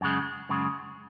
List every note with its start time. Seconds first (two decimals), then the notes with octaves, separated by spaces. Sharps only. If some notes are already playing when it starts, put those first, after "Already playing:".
0.01 F#2 C#3 G#3
0.49 F#2 C#3 G#3